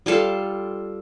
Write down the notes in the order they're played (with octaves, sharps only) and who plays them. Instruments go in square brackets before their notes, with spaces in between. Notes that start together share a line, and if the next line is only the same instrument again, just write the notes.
[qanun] G3 F4 A4 F5